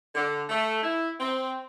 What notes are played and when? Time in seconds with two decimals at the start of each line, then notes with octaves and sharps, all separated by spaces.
0.15 D3
0.49 A3
0.83 E4
1.20 C4